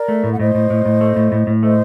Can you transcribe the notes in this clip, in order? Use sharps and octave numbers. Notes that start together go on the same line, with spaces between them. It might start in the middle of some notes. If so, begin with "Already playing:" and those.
Already playing: A#4 D5
A3
A2
F#5
A2 C5 D#5
A2
A2
A2
A3
A2
A2
A2
A3 C5 D#5